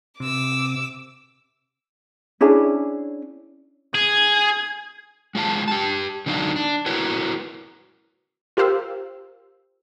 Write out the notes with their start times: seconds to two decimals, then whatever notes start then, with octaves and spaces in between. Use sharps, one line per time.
0.20 C3 D6 E6
2.41 C#4 D4 E4 G#4
3.95 G#4 G#6
5.35 G#3 F4 F5 A5
5.68 G4 A5
6.26 D3 F#3 D4 D#4 D5 F5
6.56 D4
6.86 E4 F#4 A#4 B4 C#5
8.57 F4 G4 A#4 C5 F5 E6